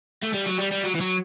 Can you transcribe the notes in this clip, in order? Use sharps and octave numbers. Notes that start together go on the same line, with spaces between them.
A3
G3
F#3
G3
G3
F#3
E3
F#3